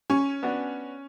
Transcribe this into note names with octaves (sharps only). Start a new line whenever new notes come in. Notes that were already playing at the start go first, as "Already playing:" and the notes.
C#4 G#5 C#6
B3 D4 F#4